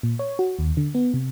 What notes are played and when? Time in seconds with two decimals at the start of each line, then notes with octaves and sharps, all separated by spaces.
0.03 A#2
0.19 C#5
0.39 F#4
0.59 D#2
0.77 D3
0.95 B3
1.14 C3